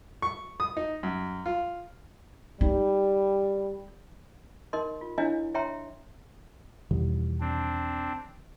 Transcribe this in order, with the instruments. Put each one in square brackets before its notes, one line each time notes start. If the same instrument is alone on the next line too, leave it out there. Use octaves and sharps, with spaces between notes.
[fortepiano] C#6
D#6
D#4
F#2
F4
[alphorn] G3 [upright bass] D#4
[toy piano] D#4 A#4 D#5 C6
F4
D4 E4 C#5 D#5 F5 G#5
C#5 E5 G5 A#5 C6
[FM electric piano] E2 B2 [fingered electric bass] D#3 E3 G3
[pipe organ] C4 D4